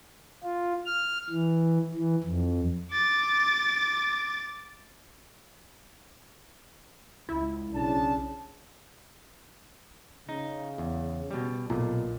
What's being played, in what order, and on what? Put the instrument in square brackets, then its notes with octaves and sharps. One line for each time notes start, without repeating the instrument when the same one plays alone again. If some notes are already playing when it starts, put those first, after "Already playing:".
[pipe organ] F4
F6
E3
E3
F2
[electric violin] D6 A6
[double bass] C#2 [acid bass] E4
[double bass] B1 [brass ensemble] C#3 D4 A5
[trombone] C#3 [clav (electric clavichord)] D#4
[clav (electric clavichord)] E2
B2 G3
[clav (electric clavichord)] B1 [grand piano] A#2